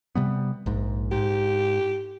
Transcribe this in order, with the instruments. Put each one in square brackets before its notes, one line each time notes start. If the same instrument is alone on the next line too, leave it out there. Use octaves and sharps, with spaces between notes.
[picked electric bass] C3 G3 B3
A#1 G#2
[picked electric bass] G#2 [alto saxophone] G4